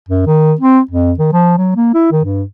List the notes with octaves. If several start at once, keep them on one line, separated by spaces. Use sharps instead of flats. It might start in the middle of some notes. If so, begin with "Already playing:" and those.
F#2
D#3
C4
F2
D#3
F3
F#3
A#3
E4
D#3
G2